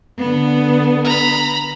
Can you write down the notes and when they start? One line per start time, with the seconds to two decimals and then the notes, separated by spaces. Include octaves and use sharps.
0.18 D3 B3
1.05 A#5 B5